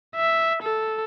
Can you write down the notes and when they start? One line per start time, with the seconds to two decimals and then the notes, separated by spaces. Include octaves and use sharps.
0.15 E5
0.63 A4